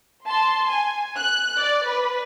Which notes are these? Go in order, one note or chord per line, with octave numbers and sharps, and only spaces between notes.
A5 C6
G#5
F#6
D5
B4